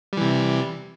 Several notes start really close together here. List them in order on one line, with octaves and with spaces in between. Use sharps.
G3 E3 C3